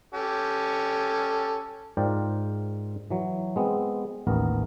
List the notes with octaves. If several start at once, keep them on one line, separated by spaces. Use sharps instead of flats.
C#4 G4 A4
G#2 F4 A#4 C5 D5 G5
E3 F#3
G#3 B3 C4
A1 D#2 B3 A#4